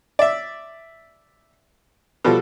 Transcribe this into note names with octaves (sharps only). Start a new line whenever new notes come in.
D5 E5
B2 F3 G3 A4